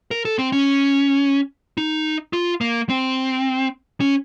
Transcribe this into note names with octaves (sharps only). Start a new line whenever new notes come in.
A#4
A4
C4
C#4
D#4
F4
A#3
C4
C#4